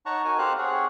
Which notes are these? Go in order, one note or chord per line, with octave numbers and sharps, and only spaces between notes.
D#4 C#5 F#5 A5 A#5 C#6
D#4 F#4 A#4 G#5
C4 G4 A4 C5 F5 F#6
C4 G#4 C#5 F#5